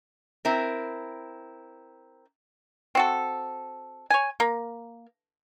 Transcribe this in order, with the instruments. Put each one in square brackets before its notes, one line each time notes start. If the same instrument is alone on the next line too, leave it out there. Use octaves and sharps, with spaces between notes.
[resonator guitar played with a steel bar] C4 E4 A#4
[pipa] C4 F#4 A4
C#5 G#5
A#3